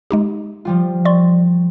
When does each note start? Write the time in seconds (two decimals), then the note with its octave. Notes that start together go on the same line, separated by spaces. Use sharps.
0.11 G#3 D#4 G4
0.65 F3 G3 F4
1.05 D5 C6 C#6